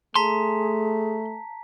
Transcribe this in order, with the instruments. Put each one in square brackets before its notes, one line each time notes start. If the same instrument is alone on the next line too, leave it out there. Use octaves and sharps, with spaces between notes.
[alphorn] A3 [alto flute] G#4 [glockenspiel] A5 A#5 B6 [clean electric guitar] C6